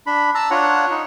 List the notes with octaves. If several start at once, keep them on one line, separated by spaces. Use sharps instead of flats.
D4 B5
A5 A#5 E6
D4 F4 C#5 F#5
D#4